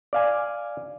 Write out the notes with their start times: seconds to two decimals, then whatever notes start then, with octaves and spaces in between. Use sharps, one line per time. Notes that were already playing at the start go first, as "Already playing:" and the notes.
0.13 D5 F5 G#5